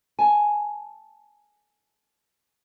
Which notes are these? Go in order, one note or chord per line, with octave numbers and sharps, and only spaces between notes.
G#5 A5